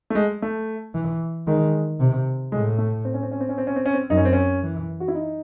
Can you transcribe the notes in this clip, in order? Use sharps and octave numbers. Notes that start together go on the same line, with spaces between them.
A3
G#3
A3
E3
D#3 G#3
C3
A2 G#3
A3
C4
C#4
C4
C#4
C4
C#4
C4
C#4
C4
C#4
C4
F#2 D#4
C#4
C4
C#4
E3
F#4
E4
D#4